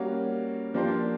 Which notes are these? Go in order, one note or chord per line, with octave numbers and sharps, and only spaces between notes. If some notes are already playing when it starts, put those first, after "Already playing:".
Already playing: G3 A#3 C#4 F#4
F3 A#3 D4 G4 C5